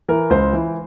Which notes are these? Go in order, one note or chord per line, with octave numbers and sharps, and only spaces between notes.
E3 A#4
C#2 C5
E3